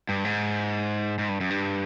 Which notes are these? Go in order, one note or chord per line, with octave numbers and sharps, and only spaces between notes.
G2
G#2
G#2
G2
F#2
G2